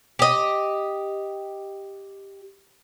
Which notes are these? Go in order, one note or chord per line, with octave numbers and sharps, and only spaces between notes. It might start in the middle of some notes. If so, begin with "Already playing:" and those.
G4 D#5